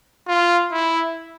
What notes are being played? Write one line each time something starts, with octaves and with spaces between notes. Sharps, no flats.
F4
E4